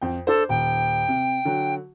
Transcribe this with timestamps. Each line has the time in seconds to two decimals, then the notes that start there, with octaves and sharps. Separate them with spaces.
0.02 F2 G5
0.27 D4 A4 C5
0.49 D#1 G5
1.09 C3
1.45 D3 F#3